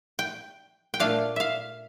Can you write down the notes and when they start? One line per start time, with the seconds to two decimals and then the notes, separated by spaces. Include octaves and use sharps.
0.19 G5
0.94 G5
1.00 A#2 A3 D4 F5
1.36 E5 F5